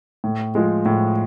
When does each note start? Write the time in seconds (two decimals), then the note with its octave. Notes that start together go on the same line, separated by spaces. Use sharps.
0.24 A2
0.55 F3 G#3
0.86 A2